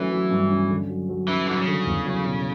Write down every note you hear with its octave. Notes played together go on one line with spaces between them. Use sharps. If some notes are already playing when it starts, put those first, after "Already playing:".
Already playing: E3 F#3 A3 C#4
F#3
G2
C#4
D3
F#3
F#3
E3 C#4
D3 F#3
C#3
D3
E2
F#3
B2